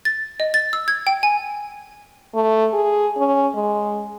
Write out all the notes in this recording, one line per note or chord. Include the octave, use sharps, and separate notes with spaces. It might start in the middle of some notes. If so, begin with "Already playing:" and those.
A6
D#5
A6
E6
G#6
G5
G#5
A3
G#4
C#4
G#3